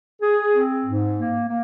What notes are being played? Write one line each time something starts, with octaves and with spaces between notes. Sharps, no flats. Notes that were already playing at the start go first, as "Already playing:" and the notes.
G#4
C4
G#2
A#3
A#3